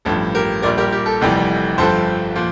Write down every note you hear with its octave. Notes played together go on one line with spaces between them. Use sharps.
A1 G2 F3 A4
G4 A#4
A#1 A#2 G3 A#4 D5
G4 A#4
G4
A4
F1 F2 C3 E3 G3
G1 G2 F3 A4 C5
A#2 F3